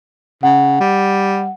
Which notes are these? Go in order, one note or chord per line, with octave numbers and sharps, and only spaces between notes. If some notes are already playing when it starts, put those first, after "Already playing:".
C#3 F#5
G3